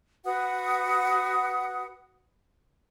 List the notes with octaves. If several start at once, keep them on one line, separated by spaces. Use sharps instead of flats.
F#4 B4 F#5 D#6